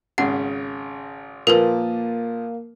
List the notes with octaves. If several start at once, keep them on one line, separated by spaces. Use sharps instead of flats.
G#1 C#3 F#5
A#2 F3 A#3 A#4 B4